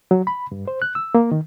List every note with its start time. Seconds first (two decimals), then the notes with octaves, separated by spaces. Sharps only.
0.11 F#3
0.27 B5
0.52 G2
0.68 C5
0.82 F#6
0.95 E6
1.15 A#3
1.32 D#3